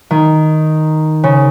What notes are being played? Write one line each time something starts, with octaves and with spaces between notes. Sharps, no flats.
D#3
C#3